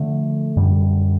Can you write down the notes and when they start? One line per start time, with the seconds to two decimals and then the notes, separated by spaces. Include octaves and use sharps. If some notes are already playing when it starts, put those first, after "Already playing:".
Already playing: D3 F3 A3
0.56 F#2 D3 G3